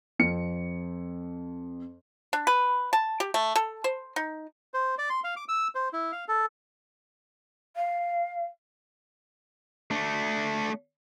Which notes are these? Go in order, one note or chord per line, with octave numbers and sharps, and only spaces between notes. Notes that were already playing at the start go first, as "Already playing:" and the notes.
F2 C#7
D4
B4
A5
G4
A3
A4
C5
D#4
C5
D5
C6
F5
D6
E6
C5
E4
F5
A4
F5
A3 D4